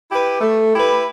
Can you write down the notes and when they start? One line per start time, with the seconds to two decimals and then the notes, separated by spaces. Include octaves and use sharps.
0.10 E4 G4 B4
0.41 A3
0.74 E4 G4 B4